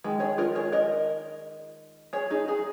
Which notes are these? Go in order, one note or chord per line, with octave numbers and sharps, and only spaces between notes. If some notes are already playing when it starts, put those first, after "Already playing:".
D#3 G#3
G#4 C#5
F4 A#4
G#4 C#5
A#4 D#5
G#4 C#5
D#4 G#4
D#4 G#4